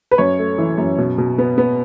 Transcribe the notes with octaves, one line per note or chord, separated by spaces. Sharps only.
B4
F#2 C#5
A3
E3
F#2
B2
B2
B3
B3